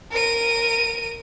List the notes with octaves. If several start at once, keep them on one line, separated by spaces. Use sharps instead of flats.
A#4 D#7